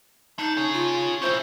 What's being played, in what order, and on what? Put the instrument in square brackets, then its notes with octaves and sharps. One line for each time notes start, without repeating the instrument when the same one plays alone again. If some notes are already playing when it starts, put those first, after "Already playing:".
[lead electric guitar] D4 [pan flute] D#4
[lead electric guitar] G#4 C#5
[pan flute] F4
[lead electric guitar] C#4 E4 [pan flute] C5